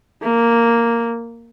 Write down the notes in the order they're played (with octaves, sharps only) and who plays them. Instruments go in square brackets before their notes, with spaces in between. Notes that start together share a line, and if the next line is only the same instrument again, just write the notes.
[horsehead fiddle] A#3